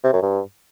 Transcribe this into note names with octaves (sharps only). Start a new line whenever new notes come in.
C3
F#2
G2